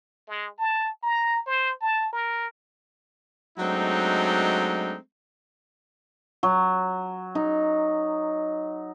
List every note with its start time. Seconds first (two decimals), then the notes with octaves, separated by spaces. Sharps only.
0.28 G#3
0.58 A5
1.03 A#5
1.47 C5
1.81 A5
2.13 A#4
3.59 F#3 G#3 A3 C4 D4 D#4
6.43 F#3
7.35 D#4